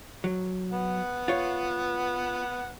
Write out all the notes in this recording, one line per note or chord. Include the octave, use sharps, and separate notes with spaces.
F#3
B3 F#5
F4 C#5